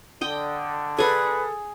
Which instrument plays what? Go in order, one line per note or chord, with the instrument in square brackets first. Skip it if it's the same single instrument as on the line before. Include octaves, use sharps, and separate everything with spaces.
[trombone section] D3 [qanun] D#5 G5
[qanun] G#4 G#5 [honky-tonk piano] A4 [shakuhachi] B4